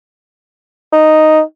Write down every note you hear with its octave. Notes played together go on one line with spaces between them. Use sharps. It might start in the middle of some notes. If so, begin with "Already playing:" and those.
D#4